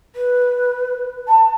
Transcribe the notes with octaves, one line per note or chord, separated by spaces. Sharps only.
B4
A5